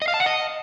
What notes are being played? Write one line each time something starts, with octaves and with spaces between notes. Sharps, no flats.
D#5
F5
A5
F#5
D#5